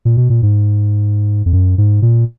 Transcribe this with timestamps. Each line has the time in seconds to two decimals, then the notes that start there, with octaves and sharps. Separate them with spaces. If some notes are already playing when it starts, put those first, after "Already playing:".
0.05 A#2
0.17 B2
0.30 A#2
0.42 G#2
1.46 F2
1.53 F#2
1.78 G#2
2.02 A#2